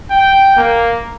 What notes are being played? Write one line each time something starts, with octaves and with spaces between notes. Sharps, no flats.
G5
A#3